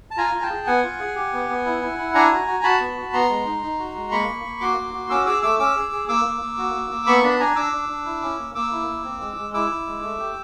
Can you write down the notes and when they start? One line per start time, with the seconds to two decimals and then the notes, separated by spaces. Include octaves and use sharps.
0.11 A5
0.17 F4 G#5 A#5
0.34 F4
0.42 G5 A5
0.50 G#4
0.67 B3 F#5 G#5
0.83 F4
1.00 G#4
1.16 G4
1.33 B3
1.49 B3
1.65 E4
1.82 E4
1.98 E4
2.15 D4 G#5 A#5
2.31 F#4
2.47 F#4
2.63 F#4 A5 B5
2.80 B3
2.97 F#4
3.13 B3 A#5 C6
3.29 G#3
3.45 D#4
3.63 D#4
3.79 F#4
3.95 G#3
4.11 A#3 B5 C#6
4.28 A#3
4.45 A#3
4.61 F#4 C6 D6
4.77 A#3
4.94 F#4
5.10 C#4 D6 E6
5.26 G#4 D6 E6
5.42 A3 D6 E6
5.59 C#4 D6 E6
5.76 G#4
5.92 G#4
6.08 A#3 D6 E6
6.25 A#3
6.42 A#3
6.58 F#4
6.75 A#3
6.91 A#3
7.07 B3 B5 C#6
7.23 D4 A5 B5
7.40 D4 G#5 A#5
7.56 D4 D6 E6
7.73 D4
7.89 D4
8.05 E4
8.22 C#4
8.38 A#3
8.55 A#3 D6 E6
8.71 E4
8.87 A#3
9.04 C4
9.20 G#3
9.37 G#3
9.54 E4 D6 E6
9.70 E4
9.86 G#3
10.02 A3
10.19 G4